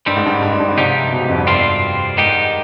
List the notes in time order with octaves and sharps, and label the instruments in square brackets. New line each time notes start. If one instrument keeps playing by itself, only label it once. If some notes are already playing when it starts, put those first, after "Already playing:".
[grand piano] G2 [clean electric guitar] D#3 G3 C4
[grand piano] G#2
G2
G2
G#2
G2
G#2
[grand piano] C3 [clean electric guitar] F3 B3 D#4 G4
[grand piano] B2
G#2
F2
G2
[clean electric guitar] C3 G3 C4 F4
[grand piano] G#2 [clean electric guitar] D#3 B3 D#4 G4